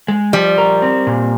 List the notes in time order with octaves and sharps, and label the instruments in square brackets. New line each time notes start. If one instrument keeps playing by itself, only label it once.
[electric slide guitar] G#3
[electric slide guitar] F3 [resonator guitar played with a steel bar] G3
[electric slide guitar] A#4
C4
A#2